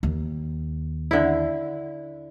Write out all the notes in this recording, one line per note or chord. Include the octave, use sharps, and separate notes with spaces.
D#2
D3 E4